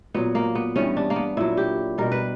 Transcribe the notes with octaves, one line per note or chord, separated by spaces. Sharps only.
A#2 F#3 B3
A#3
B3
G2 E3 G3 C#4
D4
A#3
B3
A#2 F#3 E4
G4
B2 G3 A#4
B4